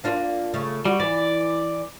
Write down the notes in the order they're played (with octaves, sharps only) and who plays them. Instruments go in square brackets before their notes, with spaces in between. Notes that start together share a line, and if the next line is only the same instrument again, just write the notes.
[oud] A#3 D4 F4
C#3 A3
[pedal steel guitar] G3 [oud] F#4
[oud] E3 [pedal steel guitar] D5